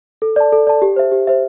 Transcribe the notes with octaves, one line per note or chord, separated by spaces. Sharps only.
A4
D5 A5
A4
D5 A5
G4
C5 E5
G4
C5 E5